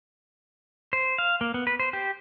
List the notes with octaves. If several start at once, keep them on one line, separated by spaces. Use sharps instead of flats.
C5
F5
A#3
B3
B4
C5
G4